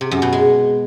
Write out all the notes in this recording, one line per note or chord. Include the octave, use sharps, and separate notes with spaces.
C3
F#2
B2
G#3